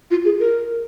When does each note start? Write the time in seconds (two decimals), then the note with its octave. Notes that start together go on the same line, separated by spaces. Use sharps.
0.11 F4
0.25 G#4
0.40 A#4